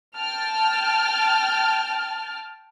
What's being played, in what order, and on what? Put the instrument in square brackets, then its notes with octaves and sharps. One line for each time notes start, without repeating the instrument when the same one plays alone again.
[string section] G5 A5 F6